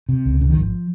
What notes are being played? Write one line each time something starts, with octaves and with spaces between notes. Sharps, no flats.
C3
C#2
C#3
D#3
G#1 F3